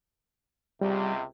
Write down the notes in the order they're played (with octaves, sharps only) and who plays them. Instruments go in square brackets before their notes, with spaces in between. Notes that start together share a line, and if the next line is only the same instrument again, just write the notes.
[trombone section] C#2 C3 [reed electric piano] G3